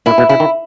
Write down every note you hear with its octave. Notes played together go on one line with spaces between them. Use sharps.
A#2 E4
B2
C#3 E4
D#3